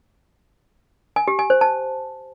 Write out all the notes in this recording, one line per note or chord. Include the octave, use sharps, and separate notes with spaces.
G#5
G4
G#5
C5
A5